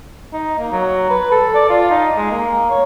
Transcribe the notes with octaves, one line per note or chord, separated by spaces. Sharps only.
D#4
A#3
F#3
B4
A4
D5
F4
D#4
G#3
A#3
C#5